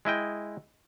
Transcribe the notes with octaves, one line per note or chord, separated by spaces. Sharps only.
G#3 E4 D#5 G5